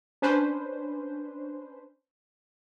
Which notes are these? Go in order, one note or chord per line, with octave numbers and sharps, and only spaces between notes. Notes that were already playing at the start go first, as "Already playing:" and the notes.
C#4 D4 B4 C5